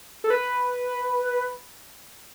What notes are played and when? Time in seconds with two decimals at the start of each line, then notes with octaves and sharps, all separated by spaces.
0.24 A4
0.30 B4